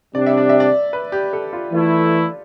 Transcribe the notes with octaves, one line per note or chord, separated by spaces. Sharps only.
C3 G3 D4 D5
E5
D5
E5
D5
B4
G4
A4
F4
E3 A3 E4